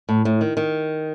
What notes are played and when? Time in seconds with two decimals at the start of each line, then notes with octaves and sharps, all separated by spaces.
0.09 A2
0.25 A2
0.41 D#3
0.57 D#3